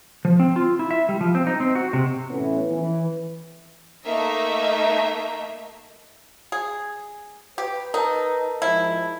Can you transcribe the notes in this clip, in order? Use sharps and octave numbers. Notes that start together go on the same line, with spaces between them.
F3
C4
F4
E4
E5
G3
F3
C4
D#4
C4
F#4
C3
A2 E3 A3 B3 C#4 E4
E3
A3 A#3 D#4 E5 A#5
G#4
G4 B4
D#4 A#4 A5
G#2 F3 E4